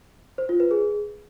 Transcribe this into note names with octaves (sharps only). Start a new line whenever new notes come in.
C5
F4
B4
G#4